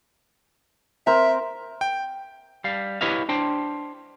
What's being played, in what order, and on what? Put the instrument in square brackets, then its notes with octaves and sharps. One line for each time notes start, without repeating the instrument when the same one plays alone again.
[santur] C4 A#4 [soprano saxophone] E5
[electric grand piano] G5
[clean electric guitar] G3 F5
E4 G4 B4 C#5 D#5 F5
D4 C5 G5